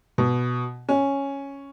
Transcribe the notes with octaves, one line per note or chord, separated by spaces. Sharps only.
B2
C#4